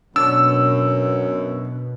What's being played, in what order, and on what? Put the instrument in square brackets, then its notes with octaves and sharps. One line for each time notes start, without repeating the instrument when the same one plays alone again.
[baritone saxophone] F#2 [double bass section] B2 [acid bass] D4 [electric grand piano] E6